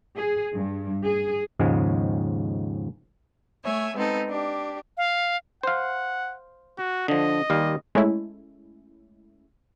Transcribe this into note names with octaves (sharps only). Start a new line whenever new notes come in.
G#4
G2
G#4
D#2 G#2 C#3 F3 G#3
A3 C#5 E5 G#5
G#3 B3 C4 D#4 A4
D4 G4
F5
C5 F5 F#5
F#4
D3 F3 D#5
D#2 G3 F5
G#3 A3 C#4 E4